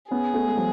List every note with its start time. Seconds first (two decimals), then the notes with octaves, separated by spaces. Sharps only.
0.11 B3 C#4 G#4
0.33 A3 B3
0.47 G#3
0.57 F3 G3